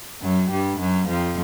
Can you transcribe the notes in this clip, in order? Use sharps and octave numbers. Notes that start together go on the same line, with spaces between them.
F#2 F#3
G2 G3
F#2 F#3
F2 F3